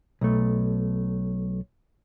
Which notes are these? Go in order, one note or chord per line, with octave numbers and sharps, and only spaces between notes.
B1 A3